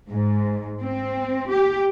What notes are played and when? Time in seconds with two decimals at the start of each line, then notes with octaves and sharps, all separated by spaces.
0.11 G#2
0.83 C4
1.51 G4